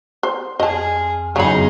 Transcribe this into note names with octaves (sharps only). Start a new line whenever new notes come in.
C5
F2 G#4 D#5 A5
F#1 E2 C#3 D#4 G#4 B5